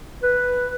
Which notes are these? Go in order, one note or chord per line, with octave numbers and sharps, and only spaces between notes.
B4